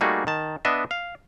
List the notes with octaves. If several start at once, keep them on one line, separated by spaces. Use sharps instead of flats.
G3 A3 A#3 D#4 F#4 G#4
D#3 A5
B3 D4 D#5 E5
F5